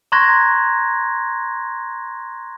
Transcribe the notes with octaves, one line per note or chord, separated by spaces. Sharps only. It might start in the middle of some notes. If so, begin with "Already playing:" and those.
A#5 C6 C#6 F#6 G#6 A#6